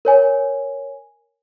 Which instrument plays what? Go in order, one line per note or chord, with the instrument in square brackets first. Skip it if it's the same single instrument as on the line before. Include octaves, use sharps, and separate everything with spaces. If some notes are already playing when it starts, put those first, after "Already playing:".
[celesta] A#4 C#5 G#5